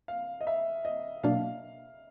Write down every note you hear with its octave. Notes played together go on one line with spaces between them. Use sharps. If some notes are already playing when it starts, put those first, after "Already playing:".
F5
D#5
E5
D#5
B2 F#3 A#3 D4 F5